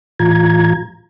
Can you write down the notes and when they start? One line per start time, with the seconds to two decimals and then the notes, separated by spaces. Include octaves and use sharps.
0.19 A2 E3 F4 A#5 G#6